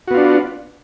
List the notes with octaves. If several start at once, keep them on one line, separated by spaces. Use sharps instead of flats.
B3 D4 F4 F#4